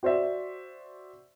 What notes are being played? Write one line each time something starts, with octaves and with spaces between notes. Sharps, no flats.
F#4 C5 D5 E5